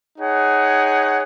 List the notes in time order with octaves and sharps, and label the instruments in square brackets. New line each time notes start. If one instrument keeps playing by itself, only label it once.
[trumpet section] D#4 G#4 C#5 F#5